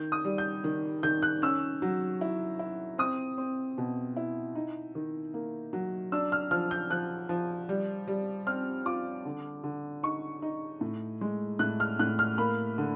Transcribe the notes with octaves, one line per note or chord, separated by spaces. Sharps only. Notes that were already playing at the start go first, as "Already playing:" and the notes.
Already playing: D#3 G6
D#6
G3
G6
D#3
D#3 G6
F#6
C#4 E6
F#3
E4
E4
C4 D#6
C4
B2
E4
D#4
D#3
A#3
F#3
D4 E6
F6
F3 F6
G6
F3 F#6
F3
G3
G3
C4 F6
F4 D6
D3
D3
D#4 C#6
D#4
A2
G#3
A2 F#6
F6
A2 F#6
F6
A#3 B5
D3